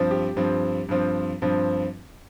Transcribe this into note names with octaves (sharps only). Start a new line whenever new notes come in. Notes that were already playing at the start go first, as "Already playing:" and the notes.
Already playing: G2 F3 C4
G4
G2 F3 C4
G2 F3 C4
G2 F3 C4